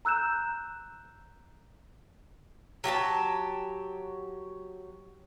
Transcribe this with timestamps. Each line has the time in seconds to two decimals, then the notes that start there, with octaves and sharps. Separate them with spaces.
0.05 A#5 E6 F#6 G6 E7
2.84 F#3 G4 D#5 A5